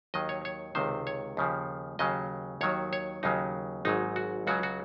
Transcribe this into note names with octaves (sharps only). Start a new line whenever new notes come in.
D#2 D#3 F#3 D#5
C#5
C#5
C#2 C3 D#3 C5
C#5
D#2 C#3 F3
D#2 C#3 F#3 D#5
D#2 D#3 F#3 C#5
C#5
D#2 C#3 F#3 D#4
G#1 G#2 F#3 D#4
F#4
C#2 C#3 F#3 F#4
F#4